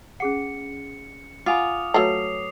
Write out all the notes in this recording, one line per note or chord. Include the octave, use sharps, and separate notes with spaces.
C#4 G#4 F#5 C#7
F4 F#5 G#5 B5 D6 D#6 F7
F#3 A3 B4 C#5 A#5 C7 F7